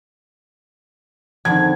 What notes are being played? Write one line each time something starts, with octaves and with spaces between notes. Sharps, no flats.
F2 D3 D#3 G#6